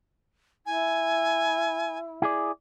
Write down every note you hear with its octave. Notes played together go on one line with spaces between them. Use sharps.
E4 G#5
E4 G#4 D5